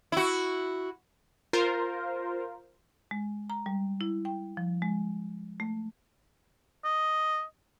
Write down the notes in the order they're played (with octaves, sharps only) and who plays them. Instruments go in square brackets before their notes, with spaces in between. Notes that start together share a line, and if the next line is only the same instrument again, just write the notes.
[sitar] E4 F#4
[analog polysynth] F4 A#4 C5
[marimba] G#3
A#5
G3
E4
G5
F3
G#3
A3
[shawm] D#5